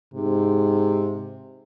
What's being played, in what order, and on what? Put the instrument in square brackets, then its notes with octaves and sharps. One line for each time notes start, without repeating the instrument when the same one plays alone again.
[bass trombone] G#2 [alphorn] C3